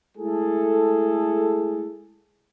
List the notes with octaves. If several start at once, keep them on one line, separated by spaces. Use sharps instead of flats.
G#3 A3 E4 G#4 A4